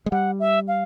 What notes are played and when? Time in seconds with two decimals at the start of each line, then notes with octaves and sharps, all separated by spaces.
0.06 G#3
0.11 G3 F#5
0.40 E5
0.68 F5